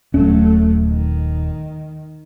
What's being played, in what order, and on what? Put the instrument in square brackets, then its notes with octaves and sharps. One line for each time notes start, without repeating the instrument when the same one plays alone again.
[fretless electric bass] D#1 C#4 [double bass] F#3 A3
[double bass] D#3